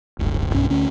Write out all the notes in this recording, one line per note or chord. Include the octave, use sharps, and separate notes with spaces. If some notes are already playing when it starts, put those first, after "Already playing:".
D1 G1
B1 G2 C#4
D2 C#4